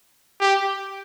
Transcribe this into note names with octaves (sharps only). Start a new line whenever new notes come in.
G4